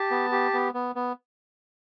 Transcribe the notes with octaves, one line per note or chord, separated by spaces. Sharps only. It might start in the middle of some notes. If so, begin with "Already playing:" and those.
Already playing: G4 A5
B3
G4
B3
B3
B3